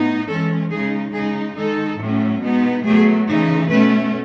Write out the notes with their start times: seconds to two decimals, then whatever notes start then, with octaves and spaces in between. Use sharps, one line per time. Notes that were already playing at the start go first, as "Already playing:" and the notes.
Already playing: A2 B3 D#4
0.27 E3 G#3 C#4 A4
0.70 C#3 G#3 D#4 G#4
1.12 C#3 G#3 D#4 G#4
1.56 D#3 G#3 D#4 A4
1.98 A2 F#3 A3 C#4
2.42 B2 G#3 B3 D#4
2.84 B2 F#3 A3 G#4
3.27 C#3 E3 A3 D#4
3.69 B2 A3 C#4 B4